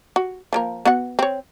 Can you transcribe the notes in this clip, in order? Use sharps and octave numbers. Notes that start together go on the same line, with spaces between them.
F#4
F3 A#3 A#4
B3 F#4 F#5
C4 C#5